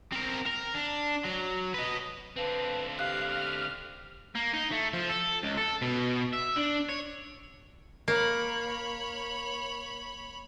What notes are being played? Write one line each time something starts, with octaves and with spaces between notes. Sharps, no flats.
C4 A#4
A#4
D4
F#3
B4 D#5
D3 C4 B4 F5 A5
G4 F5 F#6
F6
A#3
D#4
A3
F3
A4
C#2
A4
B2
E5
D4
C#5
A#3 C#5 B5